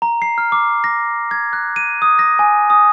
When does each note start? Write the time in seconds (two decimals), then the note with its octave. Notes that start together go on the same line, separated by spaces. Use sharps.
0.02 A#5
0.22 C7
0.38 F6
0.52 D6
0.84 A#6
1.31 G#6
1.53 F#6
1.76 D#7
2.02 D#6
2.19 A#6
2.39 G#5
2.70 D#6